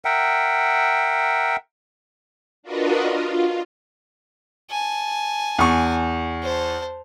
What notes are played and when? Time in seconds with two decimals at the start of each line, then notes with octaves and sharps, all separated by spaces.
0.05 A#4 E5 F#5 G5
2.63 D4 F4 F#4 A#4 B4 D#5
3.07 F4
4.70 G#5 A5
5.59 E2 C#6
6.42 C5 A5